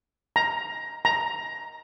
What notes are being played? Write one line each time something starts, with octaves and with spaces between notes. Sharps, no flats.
A#5
A#5